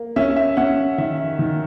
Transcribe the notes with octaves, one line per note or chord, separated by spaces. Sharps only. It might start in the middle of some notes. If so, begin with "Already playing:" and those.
Already playing: A#3
C#4 E5
E5
C#4 F#5
D#3 E5
D#3